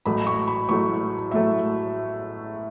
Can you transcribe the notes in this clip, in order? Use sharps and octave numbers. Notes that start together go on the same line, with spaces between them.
A1 A2 F#3 A3 B5
C#6
B5
A1 A2 F#3 A3 C#6
A2 F#3 A3 E5